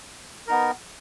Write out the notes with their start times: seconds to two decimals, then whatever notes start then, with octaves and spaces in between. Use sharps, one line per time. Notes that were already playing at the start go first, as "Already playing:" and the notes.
0.47 B3 D#4 A#4